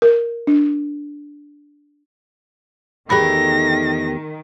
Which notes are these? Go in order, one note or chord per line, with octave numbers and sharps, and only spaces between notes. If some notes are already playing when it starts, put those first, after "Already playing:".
A#4
D4
E2 D#3 A3 G4 G#4 B5 A#6